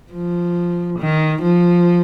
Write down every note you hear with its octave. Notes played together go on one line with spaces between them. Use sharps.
F3
D#3
F3